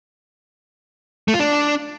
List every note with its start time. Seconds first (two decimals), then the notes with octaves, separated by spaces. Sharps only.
1.28 A3
1.34 F4
1.39 D4